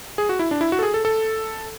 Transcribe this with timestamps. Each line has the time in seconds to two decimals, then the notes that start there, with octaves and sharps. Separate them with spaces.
0.18 G#4
0.29 F#4
0.39 E4
0.51 D4
0.61 E4
0.72 F#4
0.79 A4
0.83 G#4
0.94 A4
1.05 A4